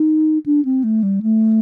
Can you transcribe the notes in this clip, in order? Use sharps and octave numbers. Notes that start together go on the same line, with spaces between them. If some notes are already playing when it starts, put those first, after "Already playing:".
Already playing: D#4
D4
C4
A3
G3
A3